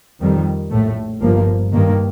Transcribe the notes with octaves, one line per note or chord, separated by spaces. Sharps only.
F2 D#3 G3
A#1 A2 A3
G1 G2 F3 A#3
G2 D#3 A#3